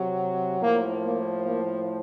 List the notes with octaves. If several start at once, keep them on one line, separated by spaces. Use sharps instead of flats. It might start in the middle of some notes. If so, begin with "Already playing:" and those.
Already playing: C3 F#3
A2 F3 A#3
A#3
A#3